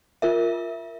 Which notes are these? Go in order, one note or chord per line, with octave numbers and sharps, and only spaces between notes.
F4 A#4 E5